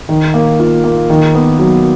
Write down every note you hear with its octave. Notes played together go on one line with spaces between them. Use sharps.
D#3
A#3
F4
A#3
D#3
B3
F#3